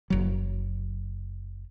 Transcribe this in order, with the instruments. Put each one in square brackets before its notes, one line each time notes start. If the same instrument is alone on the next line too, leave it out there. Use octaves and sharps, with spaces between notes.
[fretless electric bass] F#1 F#3